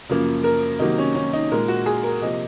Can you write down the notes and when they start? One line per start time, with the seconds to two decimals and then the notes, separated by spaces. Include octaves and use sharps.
0.09 F#2 C#3 F3 A#3
0.44 A#4
0.79 C3 D#3 F#3 A#3 D#4
0.98 C#4
1.15 C#4
1.33 D#4
1.51 A#2 G#3 A#4
1.68 F#4
1.86 G#4
2.04 A#4
2.21 C3 F3 A#3 D#5